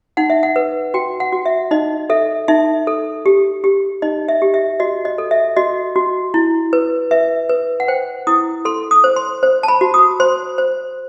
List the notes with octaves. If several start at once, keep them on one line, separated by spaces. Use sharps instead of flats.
D#4 F#5
E5
F#5
B4
F#4 G5
F#5
F#4
E5
D#4 D#5
A4 E5
D#4 E5
A4
G4
G4
D#4 D#5
E5
G4
E5
F#4 D#5
D#5
A4
E5
F#4 D#5
F#4
E4
B4
B4 E5
B4
F#5
C5 G5
E4 D#6
A4 C6
D#6
C5
C6
C5
A5
B5
F#4
D#6
C5 C6
C5